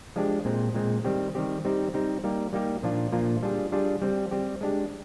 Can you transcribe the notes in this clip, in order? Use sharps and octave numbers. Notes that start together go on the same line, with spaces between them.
F3 G#3 D4 G4
A#2 G#3 C4
A#2 G#3 C4
D#3 G3 C4 G4
D#3 G3 C4 G4
G3 C4 D#4 G4
G3 C4 D#4 G4
G3 A#3 D#4 G4
G3 A#3 D#4 G4
A#2 F3 A#3 D4 F4
A#2 F3 A#3 D4 F4
G3 D4 F4 G#4
G3 D4 F4 G#4
G3 C4 G4
G3 C4 G4
G#3 D4 G4